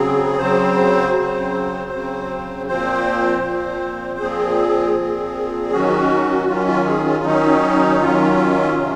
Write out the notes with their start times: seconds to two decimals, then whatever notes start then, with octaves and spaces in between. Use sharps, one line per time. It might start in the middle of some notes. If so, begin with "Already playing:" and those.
Already playing: C#3 F#3 C4 G#4
0.38 C#3 F#3 C4 C5
1.14 C#3 F#3 C4
1.91 C#3 F#3 C4
2.67 A#2 F3 C4 C5
3.42 A#2 F3 C4
4.19 A#2 F3 C4 G#4
4.95 A#2 F3 C4
5.72 D#3 F#3 C#4 F#4
6.48 D#3 F#3 C#4 F4
6.67 F4
6.86 G#4
7.05 F4
7.24 D#3 F#3 C#4 D#4
8.00 D#3 F#3 C#4 F4
8.76 C3 F#3 C#4